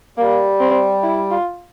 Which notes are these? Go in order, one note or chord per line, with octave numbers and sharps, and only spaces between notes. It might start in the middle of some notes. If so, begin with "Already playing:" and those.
G3 A#3
C4
E4
F4